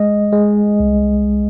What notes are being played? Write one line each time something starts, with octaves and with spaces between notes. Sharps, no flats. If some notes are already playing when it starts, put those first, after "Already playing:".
Already playing: G#3 D#5
G#3
C2